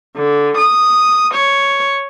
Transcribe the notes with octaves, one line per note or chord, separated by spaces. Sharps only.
D3
D#6
C#5